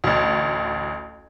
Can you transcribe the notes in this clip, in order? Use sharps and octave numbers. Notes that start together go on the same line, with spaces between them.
A1 D2